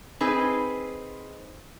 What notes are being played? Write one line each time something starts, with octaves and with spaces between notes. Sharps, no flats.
C4 D#4 G#4 B4